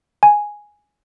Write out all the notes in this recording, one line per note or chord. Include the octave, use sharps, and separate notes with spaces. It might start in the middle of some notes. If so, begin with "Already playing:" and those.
G#5